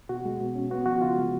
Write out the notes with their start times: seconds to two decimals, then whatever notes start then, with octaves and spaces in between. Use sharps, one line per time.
0.09 B2 F#4
0.25 G#3
0.40 B2
0.55 C#4
0.71 B3 F#4
0.86 F3 F#4
1.02 C#3 F4
1.17 G#3